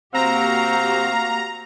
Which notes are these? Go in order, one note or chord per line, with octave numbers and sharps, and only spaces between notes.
C3 A#3 C4 F#4 G4 F5 A#5